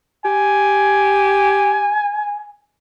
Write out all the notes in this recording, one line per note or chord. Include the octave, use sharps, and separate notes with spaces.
G4 G#5